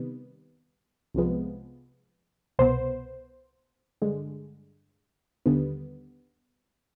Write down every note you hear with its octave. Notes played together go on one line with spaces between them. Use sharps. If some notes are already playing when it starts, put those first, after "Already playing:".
Already playing: C3 D#3 G3 B3
C2 C3 F3 G#3 B3
C2 B2 B3 C5
G2 D3 G#3
D#2 D3 G3 B3